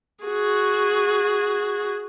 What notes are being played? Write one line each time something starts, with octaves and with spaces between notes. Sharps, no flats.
F#4 G#4